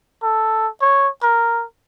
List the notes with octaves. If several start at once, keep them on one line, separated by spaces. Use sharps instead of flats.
A4
C#5
A#4